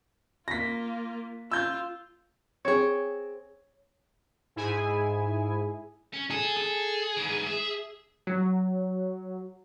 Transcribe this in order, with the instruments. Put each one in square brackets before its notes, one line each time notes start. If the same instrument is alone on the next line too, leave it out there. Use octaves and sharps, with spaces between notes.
[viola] A#3 F4 [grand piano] A#6 B6
[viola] F4 [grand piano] E6 G6
[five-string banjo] C4 G#4 [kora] C#5
[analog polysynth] G#2 E4 G#4 G#5
[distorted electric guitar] C#4
[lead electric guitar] G#4 [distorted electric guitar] A4
[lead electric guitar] G#4
[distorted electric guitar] G#2 E3
E5
[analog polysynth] F#3